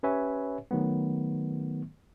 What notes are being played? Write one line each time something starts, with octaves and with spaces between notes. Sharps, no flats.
C#4 G4 B4 C#5 E5 G#5
D#3 F#3 A3 B3